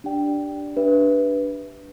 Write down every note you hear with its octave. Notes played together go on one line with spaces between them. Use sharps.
D4 G4 D5 G5
D4 G4 B4 E5